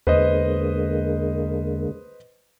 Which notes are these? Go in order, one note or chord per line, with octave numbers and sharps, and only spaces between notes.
E2 D3 G#3 A#3 B4 C5 D#5